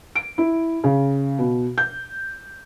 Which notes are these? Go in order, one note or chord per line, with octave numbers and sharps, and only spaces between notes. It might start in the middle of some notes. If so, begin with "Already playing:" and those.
D7
E4
C#3
B2
G6